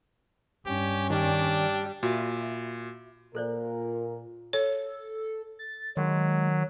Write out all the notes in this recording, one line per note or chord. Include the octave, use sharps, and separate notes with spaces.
G2 C#4 G4
D#3 G3 D4
A#2 F#4 E5
A#2 A4 A#4 C5 D5
A4 C#5
A6
D#3 F#3 G#3